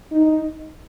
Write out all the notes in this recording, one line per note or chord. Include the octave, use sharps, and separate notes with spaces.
D#4